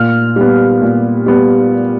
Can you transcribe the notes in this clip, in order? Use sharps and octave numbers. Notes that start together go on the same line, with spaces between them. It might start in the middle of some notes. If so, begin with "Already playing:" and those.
Already playing: A#2 F6
G3 B3
A#2
G3 B3